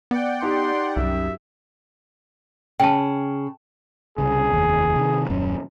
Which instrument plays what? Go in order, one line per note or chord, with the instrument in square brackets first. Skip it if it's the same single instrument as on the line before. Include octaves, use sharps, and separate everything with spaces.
[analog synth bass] B3 [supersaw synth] D5 F#5 G5
[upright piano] D#4 G4 [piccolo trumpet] C6
[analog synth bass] C2 [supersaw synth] F#2 [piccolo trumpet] E5
[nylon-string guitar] C#3 [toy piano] G5 A5
[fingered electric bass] C2 C#3 [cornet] G#4
[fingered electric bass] F1 D#2
C3 D#3
D#1 F#2 C#4